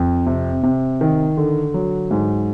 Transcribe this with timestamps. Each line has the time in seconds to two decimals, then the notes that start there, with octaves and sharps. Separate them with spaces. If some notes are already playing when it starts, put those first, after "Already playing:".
Already playing: F2
0.26 C3
0.63 C3
1.01 D#3
1.37 D3
1.74 F#3
2.11 G#2